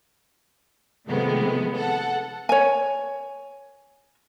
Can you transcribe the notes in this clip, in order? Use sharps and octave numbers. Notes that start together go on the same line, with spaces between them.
C3 D#3 F3 G#3 A3 B3
A4 F#5
C#5 G#5